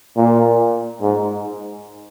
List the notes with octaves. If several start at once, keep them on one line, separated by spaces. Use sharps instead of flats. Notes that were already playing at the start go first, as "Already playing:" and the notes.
A#2
G#2